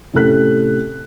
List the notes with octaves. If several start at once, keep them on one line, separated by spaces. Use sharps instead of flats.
A2 C3 C#4 A4 F#6 B6